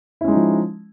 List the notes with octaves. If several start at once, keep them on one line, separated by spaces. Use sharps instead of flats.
F3 G#3 C#4 D#4 E4